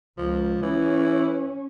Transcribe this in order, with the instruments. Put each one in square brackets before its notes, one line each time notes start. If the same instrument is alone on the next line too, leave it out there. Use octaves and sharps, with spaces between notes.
[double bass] C#2 [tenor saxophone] F3
[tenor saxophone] E3 [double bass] C#4